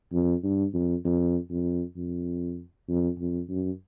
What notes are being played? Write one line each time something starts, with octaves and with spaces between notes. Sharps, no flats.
F2
G2
F2
F2
F2
F2
F2
F2
F#2